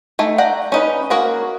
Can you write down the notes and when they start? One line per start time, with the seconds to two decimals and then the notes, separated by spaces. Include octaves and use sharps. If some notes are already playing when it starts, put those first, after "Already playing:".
0.19 A3 D#4 G#5
0.38 D5 F#5 G5 A#5
0.72 C#4 D#4 B4
1.10 A#3 F#4 G#4 A#4